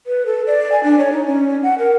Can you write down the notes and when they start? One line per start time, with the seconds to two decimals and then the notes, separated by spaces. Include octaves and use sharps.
0.07 B4
0.26 A4
0.47 D5
0.72 G#5
0.83 D4
0.99 C#5
1.13 D#4
1.26 C#4
1.63 F#5
1.79 A#4